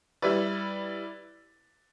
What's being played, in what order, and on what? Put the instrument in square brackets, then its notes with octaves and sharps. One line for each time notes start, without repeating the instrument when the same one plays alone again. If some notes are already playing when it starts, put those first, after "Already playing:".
[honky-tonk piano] G3 E4 B4 D5